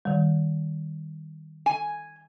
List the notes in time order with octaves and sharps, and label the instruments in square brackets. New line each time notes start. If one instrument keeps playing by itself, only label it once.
[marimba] D#3 G3
[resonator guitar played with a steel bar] G#5